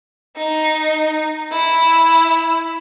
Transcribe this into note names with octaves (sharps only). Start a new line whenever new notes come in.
D#4
E4